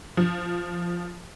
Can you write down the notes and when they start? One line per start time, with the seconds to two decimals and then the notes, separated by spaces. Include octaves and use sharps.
0.17 F3